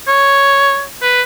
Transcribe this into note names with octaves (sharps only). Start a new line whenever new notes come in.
C#5
B4